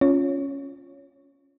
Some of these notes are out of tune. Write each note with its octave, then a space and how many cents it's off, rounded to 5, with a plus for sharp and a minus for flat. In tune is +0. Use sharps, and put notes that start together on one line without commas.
C#4 +0 F4 +0 C#5 +0